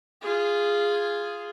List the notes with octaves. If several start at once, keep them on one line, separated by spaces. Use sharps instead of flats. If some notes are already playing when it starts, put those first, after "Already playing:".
F4 G#4